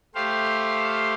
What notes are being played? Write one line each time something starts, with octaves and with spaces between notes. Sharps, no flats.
A3 G4 C5 F5